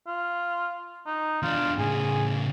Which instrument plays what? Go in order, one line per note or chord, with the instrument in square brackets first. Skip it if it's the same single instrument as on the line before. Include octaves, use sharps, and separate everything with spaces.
[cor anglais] F4
D#4
[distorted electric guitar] E2 D4 [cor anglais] F4
[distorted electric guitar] A2 C#3 [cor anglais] G#4